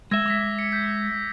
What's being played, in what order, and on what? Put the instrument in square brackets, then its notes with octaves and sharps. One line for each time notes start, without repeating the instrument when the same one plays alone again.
[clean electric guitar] G#3 E5 [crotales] E6 G#6 A#6
[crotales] D6 A#6 B6
C#7
G6 B6